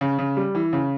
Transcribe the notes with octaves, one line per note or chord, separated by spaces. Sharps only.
C#3
C#3
G3
E3
C#3